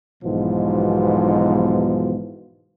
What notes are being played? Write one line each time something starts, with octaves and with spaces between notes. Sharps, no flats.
B1 G#2 B2 E3 F3